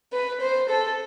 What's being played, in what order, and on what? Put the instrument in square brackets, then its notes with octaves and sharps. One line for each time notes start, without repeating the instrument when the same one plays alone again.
[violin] B4
C5
A4